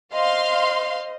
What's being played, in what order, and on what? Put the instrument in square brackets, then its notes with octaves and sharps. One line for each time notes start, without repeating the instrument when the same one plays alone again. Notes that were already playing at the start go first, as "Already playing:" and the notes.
[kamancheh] C5 D#5 [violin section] F5 C6